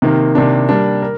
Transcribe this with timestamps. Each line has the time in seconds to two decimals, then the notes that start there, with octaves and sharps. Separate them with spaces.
0.02 C3 D#3 A#3
0.35 C3 D#3 A#3 D4
0.69 G3 A#3 D4
1.02 A#4